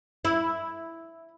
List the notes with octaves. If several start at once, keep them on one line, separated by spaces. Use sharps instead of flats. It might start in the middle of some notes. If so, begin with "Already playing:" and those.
E4